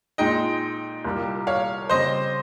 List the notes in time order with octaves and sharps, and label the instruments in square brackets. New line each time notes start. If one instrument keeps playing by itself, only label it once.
[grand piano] A#2 G#3 D#4 G#4 [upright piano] D#5 G5
[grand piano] C2 A#2 G3 A#3 F4
[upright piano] C#5 F5
[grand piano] C#3 G3 C4 [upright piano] C5 D#5